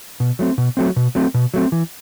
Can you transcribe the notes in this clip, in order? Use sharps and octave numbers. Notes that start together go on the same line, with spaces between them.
B2
F#3 A3 C4
B2
F#3 A3 C4
B2
F#3 A3 C4
B2
F#3 A3 C4
E3